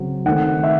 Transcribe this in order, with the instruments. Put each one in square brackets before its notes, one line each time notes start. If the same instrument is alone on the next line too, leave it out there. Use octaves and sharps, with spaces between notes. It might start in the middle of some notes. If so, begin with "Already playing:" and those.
Already playing: [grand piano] C#3 F#3 C4
D#3 A3 C4 F#5
E5